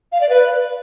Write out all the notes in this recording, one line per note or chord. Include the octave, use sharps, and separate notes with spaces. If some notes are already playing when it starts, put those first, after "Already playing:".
F5
D5
B4